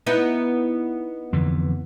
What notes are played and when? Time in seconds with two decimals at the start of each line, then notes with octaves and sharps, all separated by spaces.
0.07 B3 D#4 E4
1.33 F2 D3 E3